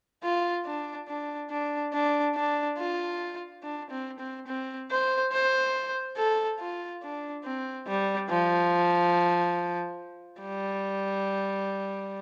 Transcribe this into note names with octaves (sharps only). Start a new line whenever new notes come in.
F4
D4
D4
D4
D4
D4
F4
D4
C4
C4
C4
C5
C5
A4
F4
D4
C4
G3
F3
G3